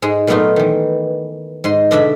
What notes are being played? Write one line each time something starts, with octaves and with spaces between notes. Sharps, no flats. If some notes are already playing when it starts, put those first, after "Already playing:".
G#2 G#3 G#4
A#2 F#3 A3 B3 D#4 F4
D#3 E3
G#2 D#5 C6
B2 D3 D4 D5 E5 B5